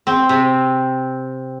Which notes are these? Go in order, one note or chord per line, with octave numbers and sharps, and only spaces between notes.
C4
C3